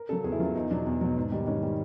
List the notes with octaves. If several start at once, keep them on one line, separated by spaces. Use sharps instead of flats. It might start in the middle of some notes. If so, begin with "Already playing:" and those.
Already playing: A#4
C#3 F#3 A4
E2 G#4
E4
C#3 F#3 F4
E2 D#4
B2 F#3 D4
E2
B2 F#3
G#2
D#3 G3
G#2 C#4
D#3 G3